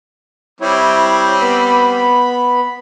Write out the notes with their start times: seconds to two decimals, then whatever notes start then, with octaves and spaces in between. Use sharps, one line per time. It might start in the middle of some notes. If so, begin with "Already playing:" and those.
0.61 G3 C4 E4 C#5
1.41 B3 B5